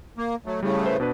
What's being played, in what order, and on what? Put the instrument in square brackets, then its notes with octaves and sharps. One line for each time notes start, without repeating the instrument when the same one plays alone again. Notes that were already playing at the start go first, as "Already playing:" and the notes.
[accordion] A#3
F#3 A3
[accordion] A2 C#3 A3 [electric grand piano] G3
[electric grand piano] B4 C5
B2 D4 B4